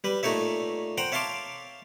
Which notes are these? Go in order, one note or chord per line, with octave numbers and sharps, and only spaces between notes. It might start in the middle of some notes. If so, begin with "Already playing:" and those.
G3 B4
A#2 A3 D#4 C#5 E5
C5 F#5 G5 A#5
C#5 E5 F5 A5 C6 D6